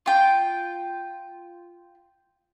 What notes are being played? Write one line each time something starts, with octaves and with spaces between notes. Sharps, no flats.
F4 G5